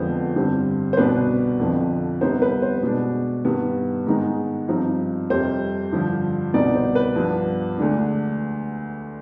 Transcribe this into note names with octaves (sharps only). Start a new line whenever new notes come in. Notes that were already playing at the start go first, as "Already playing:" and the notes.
Already playing: F2 D3 F3 G#3 B3 C5
G2 D3 G3 C4
C5
C2 B2 B3 D4 B4
F2 D3 F3
C3 G3 B3 D#4 C5
B4
C5
B2 G#3 D4
G2 D#3 G3 B3
G#2 D#3 G#3 B3 D#4
G2 F3 C4 D#4
F2 C3 G3 C5
G2 D3 F3
C2 B2 B3 D#4 D5
C5
B4
G2 F3 B3 D4
D2 D3 G#3 D4